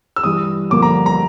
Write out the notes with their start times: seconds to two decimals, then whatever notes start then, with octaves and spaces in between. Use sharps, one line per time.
0.16 E6
0.24 G2 E3 G3 D#6
0.70 G2 D3 F3 A#3 D6
0.82 A#5
1.06 A#5